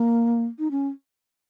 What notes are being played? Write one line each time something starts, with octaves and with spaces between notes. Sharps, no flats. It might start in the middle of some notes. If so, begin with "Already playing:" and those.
Already playing: A#3
D#4
C#4